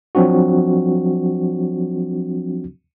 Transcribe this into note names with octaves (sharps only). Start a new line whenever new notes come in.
F3 F#3 C4 D4 F#4